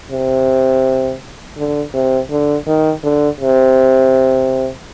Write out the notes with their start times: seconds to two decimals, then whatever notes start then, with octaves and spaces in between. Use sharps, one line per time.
0.11 C3
1.57 D3
1.94 C3
2.30 D3
2.67 D#3
3.03 D3
3.41 C3